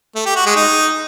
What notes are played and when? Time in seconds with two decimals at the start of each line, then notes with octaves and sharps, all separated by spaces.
0.16 A3
0.26 G4
0.36 F#4
0.46 G#3
0.56 D#4